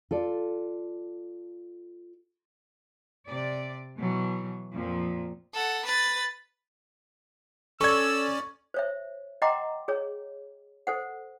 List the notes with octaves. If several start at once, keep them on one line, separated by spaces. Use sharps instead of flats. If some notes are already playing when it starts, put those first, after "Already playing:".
F4 A4 D5
C3 D5
B2 E3 F#3
F2 A#2 F3
A4 F#5
B4 A6
C#4 A4 D5 C#6 E6 G#6
C5 C#5 E5
D#5 F#5 G5 A#5 C6 D6
G#4 C#5
A4 C5 F#5